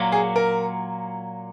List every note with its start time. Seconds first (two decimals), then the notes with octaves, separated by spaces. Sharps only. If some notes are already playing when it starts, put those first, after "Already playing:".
Already playing: A#2 F#3 A#3
0.12 G#4
0.36 A#4